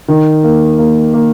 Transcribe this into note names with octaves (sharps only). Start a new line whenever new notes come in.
D#3
A#3
A#3
A#3